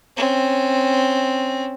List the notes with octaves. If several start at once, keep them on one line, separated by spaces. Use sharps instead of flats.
C4 C#4